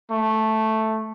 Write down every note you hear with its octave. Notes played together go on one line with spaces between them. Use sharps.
A3